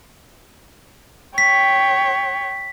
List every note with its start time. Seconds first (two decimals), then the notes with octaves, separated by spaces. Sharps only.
1.38 C#5 G5 B6